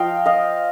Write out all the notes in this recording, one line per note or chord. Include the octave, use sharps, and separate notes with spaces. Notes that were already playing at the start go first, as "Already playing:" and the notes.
Already playing: F3 D#5 F5 G5
D#5 F5